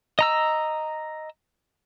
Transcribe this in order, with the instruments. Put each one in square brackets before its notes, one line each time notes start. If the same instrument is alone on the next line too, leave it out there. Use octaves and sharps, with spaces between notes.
[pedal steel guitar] D#5 A#5 E6